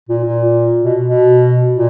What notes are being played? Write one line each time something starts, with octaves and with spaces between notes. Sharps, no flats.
A#2
A#2
B2
B2
A#2